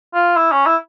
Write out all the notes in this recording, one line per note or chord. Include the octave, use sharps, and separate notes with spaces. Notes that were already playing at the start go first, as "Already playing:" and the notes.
F4
E4
C#4
E4